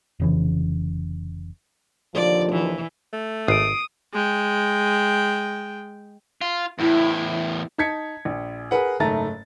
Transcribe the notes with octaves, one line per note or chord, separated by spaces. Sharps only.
F1 C#3 E3
D#2 D3 F3 D5
E3
A3
G#1 D#6 C7 D7
G#3 G5
F4
E2 A2 E4
D#4 A5 G#6 B6 C#7
A#1
G#4 A#4 B4 F#5
F#1 G#2 A3 A5 A#5 A6